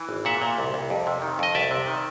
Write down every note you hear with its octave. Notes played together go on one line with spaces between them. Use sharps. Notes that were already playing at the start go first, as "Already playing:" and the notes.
Already playing: E3
G#1
A#2 E5 F#5
A#2
C2
C2
F2
C3
D#3
F2 D#5
C2 D5 E5
C3
D#3